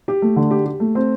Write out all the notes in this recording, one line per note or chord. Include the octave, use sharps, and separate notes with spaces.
G4
A3
D3
G4
G4
A3
C4